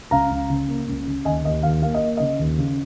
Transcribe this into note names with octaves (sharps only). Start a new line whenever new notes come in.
C#2 F5 A#5
C#2
C#3
A#3
C#2
C#3
D#2 D#5 G#5
D#2 D#5
D#2 F5
A#3 F5
D#5
A#3
C#3 D#5
D#2
C#3